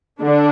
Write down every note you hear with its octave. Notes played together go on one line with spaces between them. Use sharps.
D3 D4